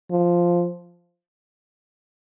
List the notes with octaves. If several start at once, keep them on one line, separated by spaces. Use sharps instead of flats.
F3